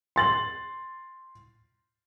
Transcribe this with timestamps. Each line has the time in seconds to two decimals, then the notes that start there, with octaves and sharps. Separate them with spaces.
0.16 C6 A6 F#7